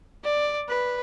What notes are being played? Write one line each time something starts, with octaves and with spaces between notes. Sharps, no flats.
D5
B4